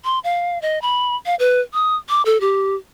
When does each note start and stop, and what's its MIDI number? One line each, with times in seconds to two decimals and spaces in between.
0.05 0.19 84
0.24 0.61 77
0.62 0.81 75
0.82 1.16 83
1.26 1.35 77
1.39 1.61 71
1.74 1.97 87
2.09 2.22 86
2.25 2.40 69
2.41 2.75 67